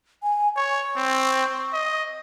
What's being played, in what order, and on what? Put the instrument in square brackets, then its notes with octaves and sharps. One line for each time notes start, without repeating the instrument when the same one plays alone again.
[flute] G#5
[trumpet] C#5 [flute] C#6
[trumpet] C4
D#5